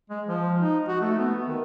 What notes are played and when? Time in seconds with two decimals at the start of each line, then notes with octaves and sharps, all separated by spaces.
0.10 G#3
0.28 F3
0.60 D#4
0.88 F#4
1.01 A3
1.18 B3
1.47 D#3